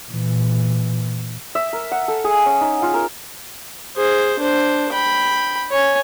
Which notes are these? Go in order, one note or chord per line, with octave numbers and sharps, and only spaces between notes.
A#2 E3
E5
A#4
F#5
A4
G#4
C#4
D#4
F4
A#4
G#4 C5
D4 C5
G5 B5
C#5 G#5